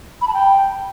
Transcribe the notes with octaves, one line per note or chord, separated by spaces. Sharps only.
B5
A5
G5